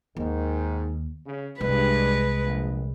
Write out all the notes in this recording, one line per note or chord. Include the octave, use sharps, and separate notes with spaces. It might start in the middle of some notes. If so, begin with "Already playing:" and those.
D#2 G#2 D#3
C#3
C2 G2 G#3 B4
A#1